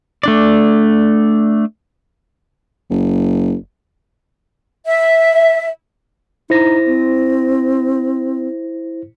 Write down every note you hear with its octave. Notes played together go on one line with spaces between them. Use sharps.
A3 D4 D5
F#1
E5
D#4 E4 C5 A#6
C4